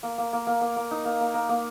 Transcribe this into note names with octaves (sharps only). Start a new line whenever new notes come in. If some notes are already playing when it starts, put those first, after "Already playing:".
A#3
A#3
A#3
A#3
A#3
A#3
D#4
A#3
A#3
A#3
A#3